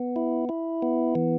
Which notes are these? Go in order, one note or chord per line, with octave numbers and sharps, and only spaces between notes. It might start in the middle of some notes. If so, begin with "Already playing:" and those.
Already playing: B3
E4
E4
B3
E3